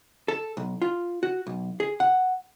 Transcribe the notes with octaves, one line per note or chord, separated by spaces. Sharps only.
A4
B1
F4
F#4
B1
G#4
F#5